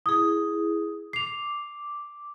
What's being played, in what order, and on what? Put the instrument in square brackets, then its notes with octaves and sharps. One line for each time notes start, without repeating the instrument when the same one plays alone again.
[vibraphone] E4 G#4 [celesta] D#6
[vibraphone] D6 [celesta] C7 F7